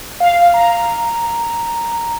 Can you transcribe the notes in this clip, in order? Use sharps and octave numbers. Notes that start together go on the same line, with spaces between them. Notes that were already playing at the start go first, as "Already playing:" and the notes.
F5
A#5